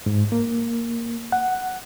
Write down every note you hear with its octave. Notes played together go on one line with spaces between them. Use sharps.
G#2
A#3
F#5